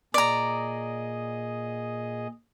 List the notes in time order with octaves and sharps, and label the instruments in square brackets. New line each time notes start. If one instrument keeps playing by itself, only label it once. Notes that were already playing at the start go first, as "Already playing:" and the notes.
[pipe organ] A#2 G#4 D#5 [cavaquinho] D5 A#5